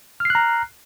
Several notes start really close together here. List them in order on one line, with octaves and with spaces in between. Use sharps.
F6 C7 F#6 A#5